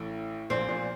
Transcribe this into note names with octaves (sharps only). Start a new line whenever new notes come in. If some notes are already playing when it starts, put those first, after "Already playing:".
Already playing: A1 A2
A#1 A#2 C4
A#1 A#2